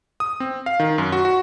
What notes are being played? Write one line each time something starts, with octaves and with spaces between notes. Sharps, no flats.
D#6
C4
F5
D#3
F#2
F#4
F#4